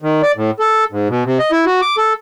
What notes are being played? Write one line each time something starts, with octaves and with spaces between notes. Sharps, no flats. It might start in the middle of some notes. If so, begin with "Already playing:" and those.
D#3
D5
A2
A4
G#2
B2
C3
D#5
E4
F#4
D6
A4